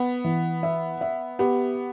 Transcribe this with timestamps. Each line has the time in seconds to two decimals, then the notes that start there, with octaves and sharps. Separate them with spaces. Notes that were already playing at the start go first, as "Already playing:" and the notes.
Already playing: B3
0.24 E3
0.63 E5
1.01 E5
1.39 B3 G4